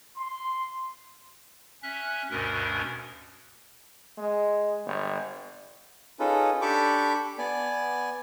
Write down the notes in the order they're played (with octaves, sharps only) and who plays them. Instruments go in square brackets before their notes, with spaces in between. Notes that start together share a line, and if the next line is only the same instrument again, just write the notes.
[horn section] C6
[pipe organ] C#4 E5 F#6
D2 G2 B2 C#4 A#4
[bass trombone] G#3
G1
[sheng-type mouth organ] C#4 D#4 F4 G#4 A4 B4
D4 G4 A4 B5 C#6 D6
B3 D5 G#5